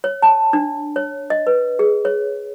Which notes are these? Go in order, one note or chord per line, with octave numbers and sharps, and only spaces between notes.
C#5
A5
D4
C#5
D#5
B4
G#4
C#5